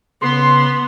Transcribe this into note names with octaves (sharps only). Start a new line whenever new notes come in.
C#3 B3 C6